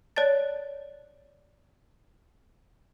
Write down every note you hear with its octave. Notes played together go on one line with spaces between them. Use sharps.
C#5 D5 A5 A6